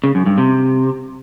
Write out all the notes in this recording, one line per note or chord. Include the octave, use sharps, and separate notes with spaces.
C#3
F#2
G2
C3